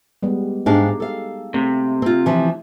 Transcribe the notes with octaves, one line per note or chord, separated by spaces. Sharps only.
G3 G#3 B3
G#2 D4 D#4 G4 G#4 F5
A4 F5
C3 A3
C4 F4
E3 F3